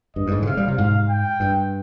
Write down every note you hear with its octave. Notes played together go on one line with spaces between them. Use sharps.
G2 D#5
G2
G#2
D3
C3 F5
G3
C3
G#2 F5
G5
G2